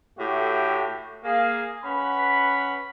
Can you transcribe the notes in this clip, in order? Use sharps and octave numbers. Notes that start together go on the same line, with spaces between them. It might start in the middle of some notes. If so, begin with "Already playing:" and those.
A2 A3 F#4 G4
A#3 G#4 F5
C#4 B4 F#5 B5